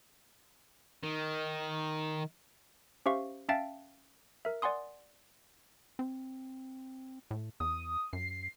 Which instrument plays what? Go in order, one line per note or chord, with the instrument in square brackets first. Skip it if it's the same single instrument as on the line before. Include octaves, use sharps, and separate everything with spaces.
[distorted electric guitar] D#3
[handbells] C#4 G4 C5 E5 F5 C#6
C#4 E5 F5 G5 A5 A6
A#4 E5
D5 F#5 G#5 C6 D#6
[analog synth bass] C4
A2
[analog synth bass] E2 [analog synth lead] D#6
[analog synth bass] F#2 [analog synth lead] C7